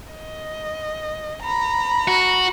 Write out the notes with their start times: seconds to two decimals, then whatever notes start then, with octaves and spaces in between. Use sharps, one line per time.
0.13 D#5
1.42 A#5 B5
2.08 F#4